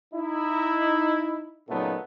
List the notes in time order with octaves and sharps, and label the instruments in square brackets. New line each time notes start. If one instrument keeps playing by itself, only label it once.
[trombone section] D#4 E4
A#2 C#3 F#3 A3 B3 D#4